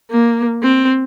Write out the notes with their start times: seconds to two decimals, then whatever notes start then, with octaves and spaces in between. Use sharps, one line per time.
0.11 A#3
0.63 C4